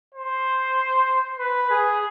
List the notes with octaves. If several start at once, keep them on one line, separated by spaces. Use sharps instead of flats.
C5
B4
G#4